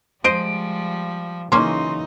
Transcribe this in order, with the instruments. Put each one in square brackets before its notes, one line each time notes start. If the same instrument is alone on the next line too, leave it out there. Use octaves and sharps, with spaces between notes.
[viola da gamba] F3 G3 [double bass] G#3 [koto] C5 D#5 [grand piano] D7
[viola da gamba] C#3 F#3 [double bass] E3 D#4 [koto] A#3 C#4 [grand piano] C6